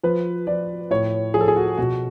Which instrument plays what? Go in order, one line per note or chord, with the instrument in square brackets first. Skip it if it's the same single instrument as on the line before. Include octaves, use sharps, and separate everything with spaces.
[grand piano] F3 B4
F3 D5
A2 C#5
F3 G#4
A4
G#4
F#4
B2 F#4